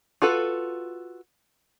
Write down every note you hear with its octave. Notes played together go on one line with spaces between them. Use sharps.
F4 F#4 A4 B4